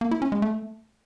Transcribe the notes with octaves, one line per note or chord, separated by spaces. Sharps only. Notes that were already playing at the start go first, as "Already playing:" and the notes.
A#3
E4
C#4
G#3
A3